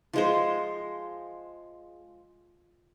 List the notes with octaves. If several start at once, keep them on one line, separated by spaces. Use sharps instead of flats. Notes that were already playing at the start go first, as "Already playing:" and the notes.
F3 G#3 C5